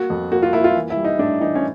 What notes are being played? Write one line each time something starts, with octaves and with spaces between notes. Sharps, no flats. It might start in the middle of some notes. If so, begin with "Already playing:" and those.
Already playing: A#3 F#4
F2
A#3 F#4
F4
A#3 E4
F4
E3
E4
G3
D#4
A2 D4
E3 D#4
C#4